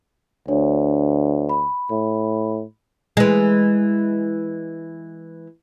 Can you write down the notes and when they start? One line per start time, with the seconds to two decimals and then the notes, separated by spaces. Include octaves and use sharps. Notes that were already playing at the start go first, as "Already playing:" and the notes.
0.48 D2 D4 C#5
1.49 B5
1.91 A2
3.17 E3 G#3